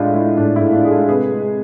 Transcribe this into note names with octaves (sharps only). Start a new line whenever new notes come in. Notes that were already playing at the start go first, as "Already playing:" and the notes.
Already playing: A2 G#3 D4 F4
G#3 E4
A2 D4
E4
A2
D4 F4
G#3 G#4
F4 A4
C3 G#4 B4
G#3